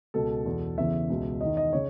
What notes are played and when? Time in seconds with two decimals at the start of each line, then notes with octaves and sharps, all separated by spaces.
0.14 C#2 B2 A4
0.46 E2 B2
0.78 E2 C#3 E3 E5
1.10 C#2 B2
1.41 E2 D#3 D#5
1.57 D#5
1.73 C#3 C#5